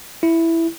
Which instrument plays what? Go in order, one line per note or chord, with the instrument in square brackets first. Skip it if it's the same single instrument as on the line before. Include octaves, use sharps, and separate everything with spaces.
[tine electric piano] E4